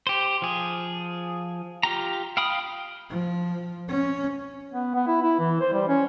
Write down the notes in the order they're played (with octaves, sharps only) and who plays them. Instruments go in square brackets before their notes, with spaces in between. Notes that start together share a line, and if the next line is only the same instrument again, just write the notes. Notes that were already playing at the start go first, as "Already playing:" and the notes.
[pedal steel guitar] G4 C5
F3 G#4
F4 G4 A#5
F5 G5 B5 D#6
[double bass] F3
C#4
[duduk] B3
B3
E4
E4
E3
C5
G3
C#4